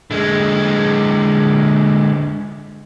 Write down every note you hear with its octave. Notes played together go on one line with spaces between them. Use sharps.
D3 G#3